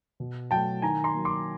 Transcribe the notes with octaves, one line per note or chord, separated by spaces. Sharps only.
B2
F#3 A3 G5 A5
D#3 G#5 A#5
A#5 C6
F#3 A#3
C6 D6